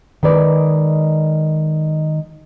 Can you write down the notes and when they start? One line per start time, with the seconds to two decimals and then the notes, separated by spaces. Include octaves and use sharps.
0.23 D#3 G#3 B4 D5